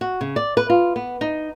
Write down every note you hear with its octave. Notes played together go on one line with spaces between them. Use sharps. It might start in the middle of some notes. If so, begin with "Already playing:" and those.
F#4
C#3
D5
B4
F4
B3
D#4